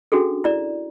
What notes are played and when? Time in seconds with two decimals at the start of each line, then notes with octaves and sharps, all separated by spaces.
0.12 C#4 D4 F#4 G#4 A4
0.44 E4 D5 A#5